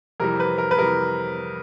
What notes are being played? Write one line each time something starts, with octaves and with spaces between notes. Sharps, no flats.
F2 C3 E3 G3 A#4
B4
A#4
B4
F2 C3 E3 G3 A#4